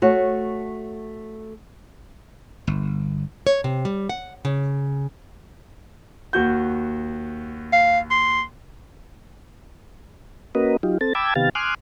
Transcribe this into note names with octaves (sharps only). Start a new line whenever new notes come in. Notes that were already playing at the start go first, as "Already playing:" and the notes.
A3 F#4 C#5
G1
C#5
C3
G3
F#5
C#3
D#2 F#4 G6
F5
C6
A#3 C#4 F#4 A#4 B4 D#5
F#3 D#4 F4 G4
C4 A4 A6
G5 A5 B5 D6 E6 G#6
C3 D#3 B3 G4 F5 A6
G#5 C6 D6 D#6 F6 F#6